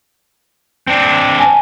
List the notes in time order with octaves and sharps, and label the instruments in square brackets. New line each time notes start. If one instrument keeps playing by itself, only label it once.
[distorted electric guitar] C4 D4
[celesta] G#5 A5